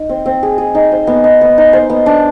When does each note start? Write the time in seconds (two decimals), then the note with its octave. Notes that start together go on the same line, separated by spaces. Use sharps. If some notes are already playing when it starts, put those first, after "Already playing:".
Already playing: D#4
0.09 C4
0.26 C4
0.43 G#4
0.58 G#4
0.75 D#4
0.92 C5
1.07 B3
1.24 D#4
1.41 B3
1.58 D#4
1.73 C5
1.90 B3
2.06 D4